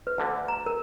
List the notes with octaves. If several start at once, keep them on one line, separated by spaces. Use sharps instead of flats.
B4
D2 D3
A#5
A#4